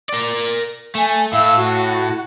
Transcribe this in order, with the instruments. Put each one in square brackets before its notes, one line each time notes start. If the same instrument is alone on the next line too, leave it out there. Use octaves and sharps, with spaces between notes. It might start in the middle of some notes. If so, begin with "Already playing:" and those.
[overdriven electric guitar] A#4 D5
[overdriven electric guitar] A3 [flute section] G#5
[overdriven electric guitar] A2 [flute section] E5 F5 E6
[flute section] F#4